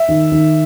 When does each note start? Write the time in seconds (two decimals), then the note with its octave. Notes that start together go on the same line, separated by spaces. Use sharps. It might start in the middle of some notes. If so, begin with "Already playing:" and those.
Already playing: E5
0.09 D#3
0.32 D#3